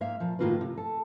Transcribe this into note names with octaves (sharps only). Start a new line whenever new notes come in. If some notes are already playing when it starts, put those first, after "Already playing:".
G#2 A#3 E5 F5
A#2 F3
A2 D#3 A#3 F4 F#4 B4
C3
A4